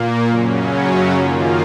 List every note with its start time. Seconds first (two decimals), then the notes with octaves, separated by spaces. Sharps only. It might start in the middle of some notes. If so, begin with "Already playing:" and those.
Already playing: A#2 A#3
0.28 F#2 C#3 F#3 C#4
1.13 F#2 D#3 A#3 F4